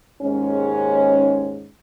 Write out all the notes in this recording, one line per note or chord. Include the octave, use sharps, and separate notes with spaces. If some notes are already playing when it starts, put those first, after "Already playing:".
D#2 G#2 G#3 C#4